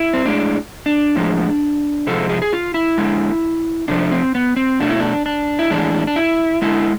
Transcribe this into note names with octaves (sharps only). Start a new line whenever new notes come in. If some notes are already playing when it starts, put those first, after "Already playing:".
Already playing: E4
C4
A2 G#3 D4
D4
A2 F3 G#3
C3 F3 G#3 A4
G#4
G#4
F4
E4
D3 G#3
C3 F3 A3 D4
C4
B3
C4
B2 A3 D4
E4
D4
D4
E4
A2 E3 G#3 D4
D4
E4
D3 G#3 E4